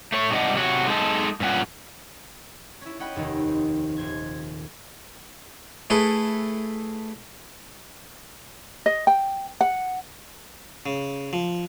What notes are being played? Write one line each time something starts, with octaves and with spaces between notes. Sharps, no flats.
A3 C#5
G#2 C3 G3 D#5 F#5
C3 F#4 C#5
G#3 D#4 A4
G2 A#2 C#4 F#5
C#4 E4
C#4 D#5 F#5 G5 B5
F1 D#2 D#4
C4
D#1 C5 G#6
A3 E4 G#4 A4 B4
D#5
G5
F#5
C#3
F3